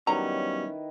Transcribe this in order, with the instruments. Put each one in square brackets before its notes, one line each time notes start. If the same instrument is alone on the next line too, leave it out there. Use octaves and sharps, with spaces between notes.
[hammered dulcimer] D#3 E4 B4 [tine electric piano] F#3 G3 B3 [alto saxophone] C#4 [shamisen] A#5